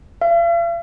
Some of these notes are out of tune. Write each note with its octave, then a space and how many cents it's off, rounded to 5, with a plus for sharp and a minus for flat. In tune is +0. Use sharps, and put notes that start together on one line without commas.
F5 -45